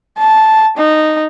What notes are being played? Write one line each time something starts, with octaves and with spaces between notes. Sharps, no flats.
A5
D#4